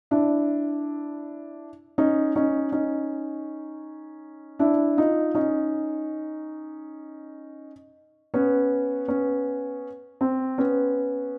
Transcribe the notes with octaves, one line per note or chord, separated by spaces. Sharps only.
D4 E4
C#4 D#4
C#4 D#4
C#4 D#4
D4 E4
D#4 F4
C#4 D#4
B3 C#4
B3 C#4
C4
B3 C#4